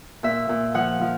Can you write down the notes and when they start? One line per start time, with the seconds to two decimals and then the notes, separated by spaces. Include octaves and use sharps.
0.23 A#2 E5
0.49 A#2
0.74 F3 F#5
1.01 F3